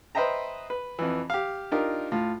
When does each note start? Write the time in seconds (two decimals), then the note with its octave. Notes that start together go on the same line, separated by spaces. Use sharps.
0.15 B4 C5 D#5 E5 G5 A#5
0.70 B4
0.99 F2 E3
1.30 G4 F5
1.72 D4 D#4 F4 G4 A#4
2.12 A2 F4